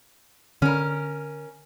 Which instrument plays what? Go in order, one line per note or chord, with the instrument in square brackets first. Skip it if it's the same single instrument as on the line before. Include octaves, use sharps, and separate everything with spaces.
[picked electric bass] D3 [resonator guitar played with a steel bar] C#4 A#4